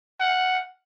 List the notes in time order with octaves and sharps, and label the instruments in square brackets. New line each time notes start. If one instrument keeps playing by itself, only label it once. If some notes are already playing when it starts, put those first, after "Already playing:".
[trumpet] F#5